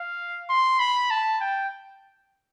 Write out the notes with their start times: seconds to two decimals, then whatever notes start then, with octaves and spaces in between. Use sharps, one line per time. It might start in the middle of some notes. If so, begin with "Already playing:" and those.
Already playing: F5
0.50 C6
0.80 B5
1.11 A5
1.41 G5